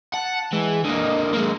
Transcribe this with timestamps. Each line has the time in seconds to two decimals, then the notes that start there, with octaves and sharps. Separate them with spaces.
0.14 F#5 A5
0.53 E3 G#3
0.84 D3 A#3 D#5
1.33 G#3 A#3